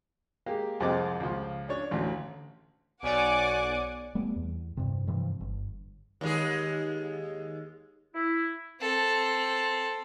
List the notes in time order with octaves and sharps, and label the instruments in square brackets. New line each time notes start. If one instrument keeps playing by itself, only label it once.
[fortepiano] G#3 A#3 G4
C2 F2 G#3 C4 D#5 D6
C#2 F3
C#4 D4 C#5
A1 D2 C#4
[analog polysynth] B1 C#5 D5 [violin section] F#5 G#5 D6
[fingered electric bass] G3 A3 B3
E2
G2 C3
G2 C3 E3 F3
G1
[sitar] D#2 G#3 G#4
[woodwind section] E4
[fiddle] C4 A4